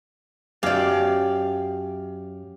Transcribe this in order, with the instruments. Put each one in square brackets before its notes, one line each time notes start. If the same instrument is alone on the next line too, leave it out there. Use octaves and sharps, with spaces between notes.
[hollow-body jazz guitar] F#2 D5 [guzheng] G4 F5